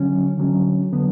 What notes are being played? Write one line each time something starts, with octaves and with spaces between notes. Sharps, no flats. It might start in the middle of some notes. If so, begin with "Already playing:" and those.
Already playing: D3 F#3 C#4
D3 F#3 C#4
D3 F#3 B3